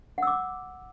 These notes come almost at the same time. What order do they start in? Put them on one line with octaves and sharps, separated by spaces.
F#5 E6 D6